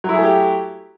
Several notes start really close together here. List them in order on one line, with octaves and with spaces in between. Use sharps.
F#3 E4 G#4 A3 G4